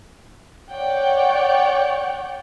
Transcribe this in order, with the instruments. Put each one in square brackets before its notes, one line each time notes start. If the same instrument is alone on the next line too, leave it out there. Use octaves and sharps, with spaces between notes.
[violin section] C#5 D5 F#5 G5